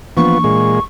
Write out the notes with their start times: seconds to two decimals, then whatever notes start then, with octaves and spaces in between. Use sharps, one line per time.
0.17 E3 F3 A#3 B3 D4 C#6
0.44 A#2 G#3